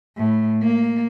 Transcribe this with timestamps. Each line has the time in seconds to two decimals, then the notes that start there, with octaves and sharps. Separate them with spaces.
0.17 A2
0.62 A#3